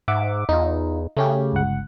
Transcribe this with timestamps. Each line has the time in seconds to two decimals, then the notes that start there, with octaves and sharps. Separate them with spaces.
0.08 G#2 E5 F#5 D6
0.49 E2 D#4 F4
1.17 C#3 A3 C#4 G4
1.53 G1 C#2 F#5